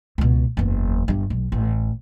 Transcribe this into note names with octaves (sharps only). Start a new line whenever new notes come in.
C#2 B2
F#1 E2
G1 G2
B1
A1